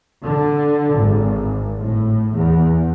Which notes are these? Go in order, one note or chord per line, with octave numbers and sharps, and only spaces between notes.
D3
G#1
A2
E2